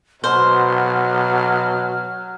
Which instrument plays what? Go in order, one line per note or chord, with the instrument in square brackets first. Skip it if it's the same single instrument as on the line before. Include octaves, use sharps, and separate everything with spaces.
[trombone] B2 [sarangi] F#3 [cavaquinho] C5 [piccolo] F6